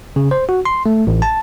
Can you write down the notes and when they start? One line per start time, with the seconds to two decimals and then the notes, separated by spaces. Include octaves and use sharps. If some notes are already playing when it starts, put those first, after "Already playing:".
0.16 C#3
0.31 C5
0.49 F#4
0.65 C6
0.86 A3
1.07 A1
1.22 A5